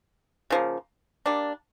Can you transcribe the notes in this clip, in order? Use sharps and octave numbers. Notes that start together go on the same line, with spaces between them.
C#3 F3 A#3
G3 A#3 D4